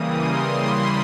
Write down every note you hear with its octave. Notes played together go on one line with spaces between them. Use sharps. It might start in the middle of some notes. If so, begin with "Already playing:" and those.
Already playing: C#3 E3 G3 A#3 D#6
C6
B5